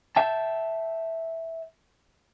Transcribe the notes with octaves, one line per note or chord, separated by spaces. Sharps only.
E5 G5 A5